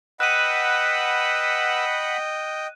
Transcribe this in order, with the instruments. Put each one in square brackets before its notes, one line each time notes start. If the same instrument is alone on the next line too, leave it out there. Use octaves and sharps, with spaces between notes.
[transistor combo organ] B4 E6 [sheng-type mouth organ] D#5 G5 [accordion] F#5 B5 [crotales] F#6 D#7